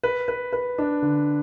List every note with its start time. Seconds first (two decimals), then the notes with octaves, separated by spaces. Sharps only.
0.04 B4
0.28 B4
0.53 B4
0.78 D4
1.02 D3